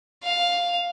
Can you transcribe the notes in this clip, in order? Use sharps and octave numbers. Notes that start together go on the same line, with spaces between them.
F5